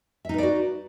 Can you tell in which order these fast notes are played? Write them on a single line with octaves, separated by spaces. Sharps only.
E5 D#4 B4 D5 F#4